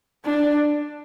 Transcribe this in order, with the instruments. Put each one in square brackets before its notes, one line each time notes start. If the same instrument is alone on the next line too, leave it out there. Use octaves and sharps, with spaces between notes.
[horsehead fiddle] D4